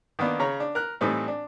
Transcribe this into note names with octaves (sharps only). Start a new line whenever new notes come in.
D#3 A#3 B3 D4
C#3 C#5 A#5
D4
A#4 F#6
A2 E3 G3 C4 D#4 A4
D4